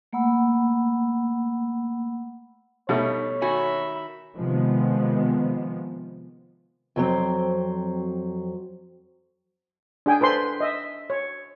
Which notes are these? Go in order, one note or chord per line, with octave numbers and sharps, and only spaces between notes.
A3 A#3 F#5 B5 E6
B2 G3 A3 D#4 C#5
D#3 F#4 E5 G#5 B5
C3 D#3 F3 G#3 B3
F2 F#3 C4
D4 G#4 G5 G#5
A4 B4 C5 C6
D#5 E5
C#5